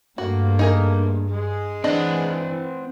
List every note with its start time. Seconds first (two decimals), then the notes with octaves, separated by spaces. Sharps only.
0.18 G2 A3 A#3 F#4
0.59 D#4 G#4 A#4
1.30 G#3
1.84 E3 C4 D4 D#5 F#5